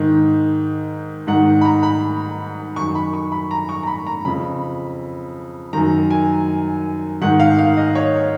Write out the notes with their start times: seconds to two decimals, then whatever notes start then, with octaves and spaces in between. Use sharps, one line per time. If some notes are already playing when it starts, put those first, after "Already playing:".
Already playing: G#2 D#3
1.27 G#2 D#3 F#5
1.61 B5
1.65 A#5
1.83 B5
2.76 F#2 D#3 C#6
2.95 B5
3.13 C#6
3.32 B5
3.51 A#5
3.69 C#6
3.83 A#5
3.87 B5
4.07 A#5
4.25 F2 C#3 B5
5.73 F#2 D#3 A#5
6.10 G#5
7.21 G#2 D#3 F#5
7.40 F5
7.59 F5
7.77 D#5
7.95 C#5